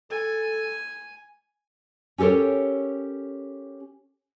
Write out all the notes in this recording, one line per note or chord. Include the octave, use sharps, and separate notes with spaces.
A4 G#5
C#4 G4 A4 A#4 C#5